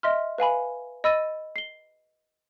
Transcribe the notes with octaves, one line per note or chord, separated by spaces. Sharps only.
D#5 E5 C6 F6
B4 F5 G#5 B5
D#5 B5 E6 A6 D#7
C7 G7